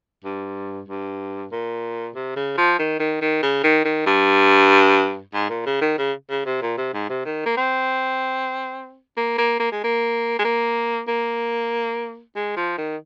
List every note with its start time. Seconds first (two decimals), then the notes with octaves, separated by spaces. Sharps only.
0.24 G2
0.88 G2
1.52 A#2
2.15 C3
2.36 C#3
2.58 F3
2.79 D#3
3.00 D#3
3.21 D#3
3.43 C#3
3.64 D#3
3.85 D#3
4.06 G2
5.34 G#2
5.49 A#2
5.66 C#3
5.81 D#3
5.98 C#3
6.30 C#3
6.46 C3
6.62 A#2
6.77 C3
6.94 G#2
7.09 C3
7.25 D#3
7.46 A#3
7.57 C4
9.17 A#3
9.38 A#3
9.60 A#3
9.72 G#3
9.84 A#3
10.39 G#3
10.44 A#3
11.08 A#3
12.36 G#3
12.56 F3
12.77 D#3